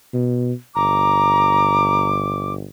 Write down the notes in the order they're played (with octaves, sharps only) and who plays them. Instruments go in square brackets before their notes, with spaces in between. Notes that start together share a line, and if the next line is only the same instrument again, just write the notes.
[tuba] B2
[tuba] G1 [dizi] A#5 [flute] D6